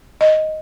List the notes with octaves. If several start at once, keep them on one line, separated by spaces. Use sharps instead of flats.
D#5